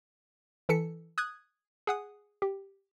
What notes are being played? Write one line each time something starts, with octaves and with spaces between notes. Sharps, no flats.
E3 A4 B6 C#7
D#6 F#6 G#6
G#4 F#5 D#6
G4